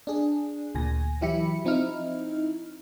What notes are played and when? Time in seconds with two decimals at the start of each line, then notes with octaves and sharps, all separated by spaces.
0.07 D4 G#4
0.75 D2 A#2 G#5 A#6
1.21 E3 F#3 E4 G4 B5 C#7
1.65 F3 C4 D#4 E4 F6